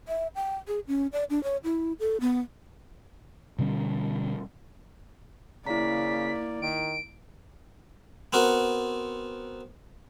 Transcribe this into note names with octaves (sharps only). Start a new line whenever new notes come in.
E5
G5
G#4
C#4
D5
D4
C#5
E4
A4
B3
B2 D3 G3 C#4
C#3 A#3 E4 D5 A#5 B6
D#3 D7
B3 C4 F#4 A#4